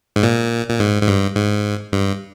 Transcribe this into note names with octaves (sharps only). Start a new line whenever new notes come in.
G#2
A#2
A#2
G#2
G#2
G2
G#2
G2